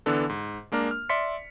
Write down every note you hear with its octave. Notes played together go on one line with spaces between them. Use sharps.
D3 E3 B3 D4 A4
G#2
G#3 A#3 D4 A#4
F6
D5 E5 C6 B6 C#7